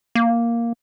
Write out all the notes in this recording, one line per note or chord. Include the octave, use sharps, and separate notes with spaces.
A#3